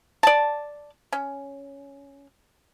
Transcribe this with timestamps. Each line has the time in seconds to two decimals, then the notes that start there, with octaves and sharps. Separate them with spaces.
0.23 D5 A5
1.12 C#4